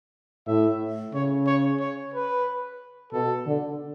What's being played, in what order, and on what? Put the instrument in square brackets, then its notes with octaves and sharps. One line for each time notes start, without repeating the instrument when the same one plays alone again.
[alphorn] A2 [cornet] E5
[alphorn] C#3 [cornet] C#5
[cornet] C#5
C#5
B4
[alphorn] B2 [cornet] A4
[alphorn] D3